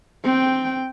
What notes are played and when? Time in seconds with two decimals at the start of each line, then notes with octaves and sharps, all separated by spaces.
0.24 C4 G5